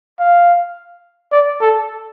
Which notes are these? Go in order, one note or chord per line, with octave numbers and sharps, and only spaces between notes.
F5
D5
A4